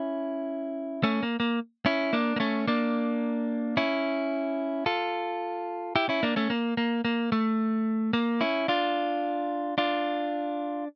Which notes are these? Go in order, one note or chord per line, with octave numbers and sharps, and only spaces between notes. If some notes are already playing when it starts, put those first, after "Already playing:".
Already playing: C#4 E4
A3 C#4
A#3
A#3
C#4 E4
A#3 D4
A#3
A3 C#4
A#3 D4
C#4 E4
F4 A4
E4 G4
C#4 E4
A#3 D4
A3 C#4
A#3
A#3
A#3
A3
A#3
C#4 E4
D4 F4
D4 F4